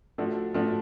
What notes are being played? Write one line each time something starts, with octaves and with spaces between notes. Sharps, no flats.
F3 A3 D4 F#4
F3 A3 D4 F#4